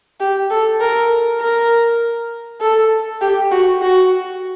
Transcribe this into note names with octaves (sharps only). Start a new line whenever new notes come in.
G4
A4
A#4
A#4
A4
G4
F#4
F#4